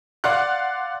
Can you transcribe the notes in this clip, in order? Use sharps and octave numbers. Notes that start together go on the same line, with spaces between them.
D5 F5 F#5 C6 F#6